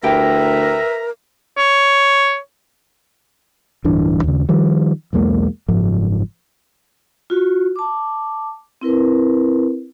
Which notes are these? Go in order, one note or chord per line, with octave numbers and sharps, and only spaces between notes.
D2 E4 G4 A#4 B4 E5 G5 A#5
C#5
D1 G2 E3 D4
D#2 C#3
D#3 F3 G3
B1 E2 G#3 A#3
F#1 G#2 F3
F4 F#4
A5 D6
C4 E4 A#4 B4